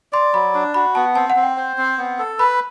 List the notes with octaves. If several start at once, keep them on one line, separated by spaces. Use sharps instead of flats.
D5 C6
F#3 B5
D4
F#4 B5
B3 A5
C4 A5
F#5
C4
G5
C5
C4
B3
A4
B4 B5